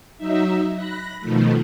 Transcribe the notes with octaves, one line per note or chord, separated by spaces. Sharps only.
F#3 D#4 E5
B5 F#6 A#6
B2 D#3 F3 A3